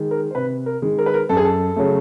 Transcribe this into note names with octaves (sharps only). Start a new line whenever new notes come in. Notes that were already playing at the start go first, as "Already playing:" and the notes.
Already playing: D#3 G#3
A#4
C5
C3 B4
A#4
D#3 G#3
A#4
B4
A#4
F#2 A4
G#4
A4
C#3 F#3 A3